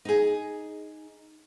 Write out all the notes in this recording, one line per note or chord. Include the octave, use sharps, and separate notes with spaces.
D#4 G#4